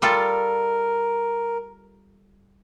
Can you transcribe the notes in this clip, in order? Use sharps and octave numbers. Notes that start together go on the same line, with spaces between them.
G3 F4 A4 A#4